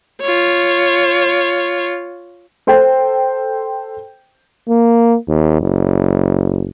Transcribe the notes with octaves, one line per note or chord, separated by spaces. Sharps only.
F4 C#5
A4 C5 G5
A#3
D#2
F#1